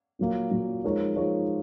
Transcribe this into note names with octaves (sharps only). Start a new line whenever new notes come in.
A#2 F#3 A#3
A#2 F#3 A#3
F3 G#3 D#4 A#4 C#5
F3 G#3 D#4 A#4 C#5